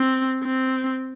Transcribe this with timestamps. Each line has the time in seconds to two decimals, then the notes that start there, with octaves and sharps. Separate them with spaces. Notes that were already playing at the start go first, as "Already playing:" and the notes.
Already playing: C4
0.44 C4